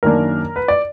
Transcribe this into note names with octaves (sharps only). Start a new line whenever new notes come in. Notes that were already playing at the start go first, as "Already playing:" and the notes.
F#2 D#3 A#3 D4 A#4
B4
D5